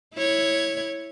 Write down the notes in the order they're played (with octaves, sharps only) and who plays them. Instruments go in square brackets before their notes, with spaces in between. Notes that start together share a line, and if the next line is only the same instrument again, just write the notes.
[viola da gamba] E4 C#5